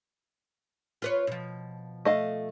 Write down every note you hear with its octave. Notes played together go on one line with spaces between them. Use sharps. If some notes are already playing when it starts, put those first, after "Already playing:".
F4 B4 C#5
B2 F3
A3 D#5 F5